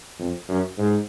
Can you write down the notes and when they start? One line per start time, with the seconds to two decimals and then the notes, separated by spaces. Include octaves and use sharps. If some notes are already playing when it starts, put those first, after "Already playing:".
0.19 F2
0.49 F#2
0.77 G#2